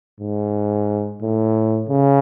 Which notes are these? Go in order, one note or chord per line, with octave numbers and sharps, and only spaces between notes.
G#2
A2
C#3